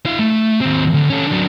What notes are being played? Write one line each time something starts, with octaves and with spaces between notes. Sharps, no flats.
E4 F5
A3
D#2 C4
D2
C#4 A4
F#3 D4